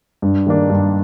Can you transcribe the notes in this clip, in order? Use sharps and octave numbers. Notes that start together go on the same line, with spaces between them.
G2
D#3 A#3 D4
G2